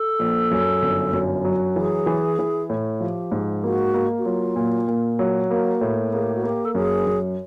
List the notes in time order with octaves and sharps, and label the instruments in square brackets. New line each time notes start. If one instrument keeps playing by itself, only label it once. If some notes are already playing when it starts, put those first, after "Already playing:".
Already playing: [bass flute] A4
[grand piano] A#1
F#2
G1
F#2
F#3
[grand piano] E3 [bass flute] G#4
[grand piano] E3
E3
A2
[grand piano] F3 [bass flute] G4
[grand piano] G#2
[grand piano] A#3 [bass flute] F#4
[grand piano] A#3
[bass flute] F#4
[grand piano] F#3 [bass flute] F4
[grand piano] A#2
A#2
F#3
[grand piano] A#3 [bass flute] F#4
[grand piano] A2
[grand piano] A#3 [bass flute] G#4
[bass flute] G4
F#4
[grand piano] A#3 [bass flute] G4
[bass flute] A4
[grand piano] F#2 [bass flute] G#4
[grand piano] F#2